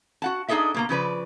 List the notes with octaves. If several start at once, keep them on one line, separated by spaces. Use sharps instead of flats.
F#4 F#5 A5
D4 D#4 G#4 A4 D#5 E5
B2 A#3 A#5
C#3 F3 B4 D5